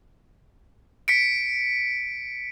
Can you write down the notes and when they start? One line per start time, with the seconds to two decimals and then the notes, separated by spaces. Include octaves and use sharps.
1.08 B6 C#7 D7